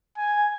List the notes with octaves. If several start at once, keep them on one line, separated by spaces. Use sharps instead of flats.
G#5